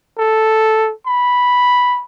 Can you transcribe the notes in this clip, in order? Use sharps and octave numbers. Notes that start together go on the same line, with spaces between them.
A4
B5